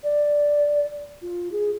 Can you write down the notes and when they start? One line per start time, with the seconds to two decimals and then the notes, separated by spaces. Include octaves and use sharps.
0.04 D5
1.22 F4
1.52 G#4